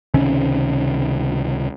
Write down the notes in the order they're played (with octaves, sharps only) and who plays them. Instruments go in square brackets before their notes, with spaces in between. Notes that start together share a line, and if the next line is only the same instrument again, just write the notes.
[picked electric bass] C#2 C3 D#3 C#4